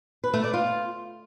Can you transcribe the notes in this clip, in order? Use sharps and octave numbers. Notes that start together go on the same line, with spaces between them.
B4
A3
D5
F4